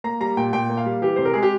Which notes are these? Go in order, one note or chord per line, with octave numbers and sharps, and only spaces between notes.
A#3 A#5
G3 A#5
A#2 G5
A#2 G5
A#3
F5
G3
E3 G4
C3 C5
A#4
G#3 G#4
G4